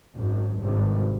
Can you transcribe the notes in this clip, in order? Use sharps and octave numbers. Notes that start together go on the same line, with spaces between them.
G#1 F#2
G#1 G2 C3